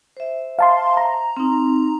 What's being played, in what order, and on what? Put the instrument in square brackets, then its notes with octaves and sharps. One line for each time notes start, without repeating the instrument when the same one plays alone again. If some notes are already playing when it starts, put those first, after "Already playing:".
[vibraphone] C5 E5
[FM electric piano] F5 A5 C6
A#5
[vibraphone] C4 D#4